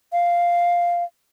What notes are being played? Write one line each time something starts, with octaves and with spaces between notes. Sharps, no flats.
F5